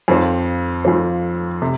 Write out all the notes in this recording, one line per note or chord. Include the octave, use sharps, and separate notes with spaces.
F2 F3 C4
F2 F3 C4
C3